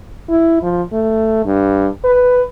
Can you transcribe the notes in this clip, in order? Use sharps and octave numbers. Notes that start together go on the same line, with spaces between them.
E4
F3
A3
G2
B4